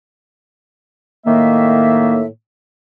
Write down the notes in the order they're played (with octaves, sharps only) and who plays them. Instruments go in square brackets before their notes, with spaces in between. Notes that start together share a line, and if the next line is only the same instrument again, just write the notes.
[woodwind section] A2 D#3 A#3 E5